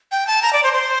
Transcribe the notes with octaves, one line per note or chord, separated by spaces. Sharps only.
G5
A5
A#5
D5
C5
C5